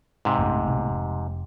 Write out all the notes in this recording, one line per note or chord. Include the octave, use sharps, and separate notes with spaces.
G#2 C3
A#1 F#2 A3
C2 B2 A3
F1